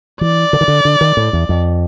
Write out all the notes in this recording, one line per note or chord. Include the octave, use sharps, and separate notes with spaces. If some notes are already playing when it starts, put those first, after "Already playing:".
E3 D5
D3
D#3
D3
D3
D#3
A2
E2
F2